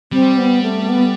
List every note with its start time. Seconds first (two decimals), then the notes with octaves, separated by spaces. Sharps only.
0.12 G3 C4
0.38 B3
0.63 A3
0.89 B3